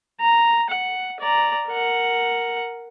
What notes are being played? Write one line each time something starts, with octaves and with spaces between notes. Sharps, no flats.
A#5
F#5
D5 A#5
A#4 F#5